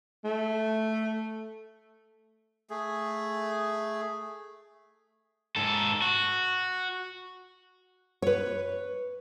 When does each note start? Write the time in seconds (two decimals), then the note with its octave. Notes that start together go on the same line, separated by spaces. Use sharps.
0.25 A3
2.70 A3 G#4
5.56 G#2 A4
6.02 F#4
8.22 B4 C#5